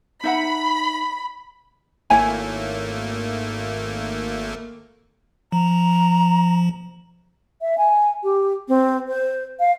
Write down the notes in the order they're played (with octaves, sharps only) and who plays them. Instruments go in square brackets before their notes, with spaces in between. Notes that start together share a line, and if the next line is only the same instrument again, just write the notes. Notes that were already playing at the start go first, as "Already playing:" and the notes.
[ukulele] D#4 E5 F#5 [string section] B5
[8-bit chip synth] G#1 A3 A#3 [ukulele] E4 C#5 G#5
[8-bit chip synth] F3 [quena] A#5
[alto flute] E5
G#5
G4
C4
C5
F5